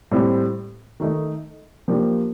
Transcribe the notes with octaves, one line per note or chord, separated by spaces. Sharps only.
A2 G3 C4 G4
D#3 A3 D#4
F3 A#3 D4 G4